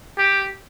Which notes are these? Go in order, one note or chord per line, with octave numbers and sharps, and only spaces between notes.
G4